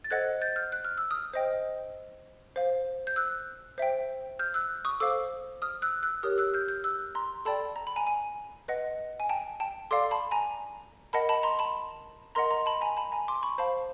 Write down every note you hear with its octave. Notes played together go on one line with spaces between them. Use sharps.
A6
A4 C5 D#5 F#5 F#6 G#6
G6 A6
F6 G6
F#6
F6
E6
D#6 F6
C5 D#5 G5
C5 F5
G6
E6 F#6
C5 E5 G5
F6 G6
E6 F#6
C#6 D#6
A4 C5 F5 D6 E6
D#6 F6
E6 F#6
E6 F#6
G4 A#4 C#5 D#6 F6
E6 F#6
F6 G6
F6 G6
E6 F#6
A#5 C6
A4 D5 G5 A5 B5
A#5
B5
G#5 A#5
G#5
B4 D#5 F#5
G#5
G5 A5
G5 A5
A4 D5 F5 C6 D6
A5 B5
G#5 A#5
A#4 D#5 F#5 A5 B5
A5 B5
A#5 C6
A5 B5
A#4 D#5 F#5 A#5 C6
A#5 C6
A5 B5
G#5 A#5
A5 B5
G#5 A#5
C6 D6
B5 C#6
C5 F5 A5 B5